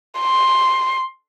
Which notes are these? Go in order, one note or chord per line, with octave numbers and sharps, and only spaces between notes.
C6